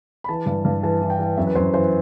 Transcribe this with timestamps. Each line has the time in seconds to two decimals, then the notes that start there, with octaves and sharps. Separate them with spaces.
0.24 B5
0.29 E3 A5
0.46 G2
0.65 G2
0.83 E3 A5
1.02 E3
1.10 G5
1.19 E3
1.37 F#2 E5
1.47 B4
1.55 F#2 C5
1.74 E3 C5